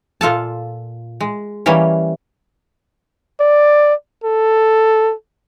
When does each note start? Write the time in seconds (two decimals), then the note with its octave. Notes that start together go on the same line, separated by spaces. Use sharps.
0.21 A#2 F4 A4 A5
1.21 G#3
1.66 E3 G3 A#3 C#4
3.40 D5
4.24 A4